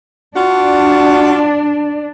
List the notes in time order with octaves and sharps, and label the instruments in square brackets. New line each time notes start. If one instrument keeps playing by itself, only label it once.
[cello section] D4 [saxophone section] F4 F#4